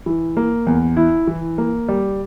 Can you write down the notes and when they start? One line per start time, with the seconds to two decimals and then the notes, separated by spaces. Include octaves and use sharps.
0.06 E3
0.37 A#3
0.67 E2
0.97 E4
1.27 E3
1.58 A#3
1.88 G3